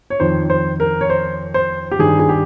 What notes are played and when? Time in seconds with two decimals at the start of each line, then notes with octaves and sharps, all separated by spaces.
0.10 C#5
0.20 F2 D#3 C5
0.50 C5
0.80 A#4
1.01 C#5
1.10 C5
1.54 C5
1.91 G4
1.99 G2 D#3 G#4
2.19 G#4
2.29 G4